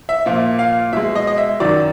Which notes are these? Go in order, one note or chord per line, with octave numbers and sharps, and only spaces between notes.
E5
A#2 F3 A#3 E5
F5
B2 G#3 E5
D#5
D#5
E5
F#2 D#3 F#3 D5